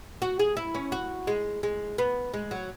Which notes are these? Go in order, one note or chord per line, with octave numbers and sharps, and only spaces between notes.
F#4
G#4
E4
C#4
F#4
G#3
G#3
B3
G#3
F#3